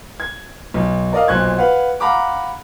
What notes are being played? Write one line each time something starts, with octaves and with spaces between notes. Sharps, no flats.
G#6
B1
A#4 D5 D#5 F5
B1 A#2 C5 C#6 F#6 G#6
B4 F5 F#5
F5 F#5 A#5 B5 D6